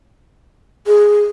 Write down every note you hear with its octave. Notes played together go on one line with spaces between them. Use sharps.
G#4